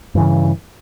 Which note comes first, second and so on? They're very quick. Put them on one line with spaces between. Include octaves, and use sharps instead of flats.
G2 E3 C#3